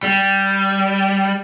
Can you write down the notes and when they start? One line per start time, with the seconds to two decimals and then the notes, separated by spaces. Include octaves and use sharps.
0.03 G3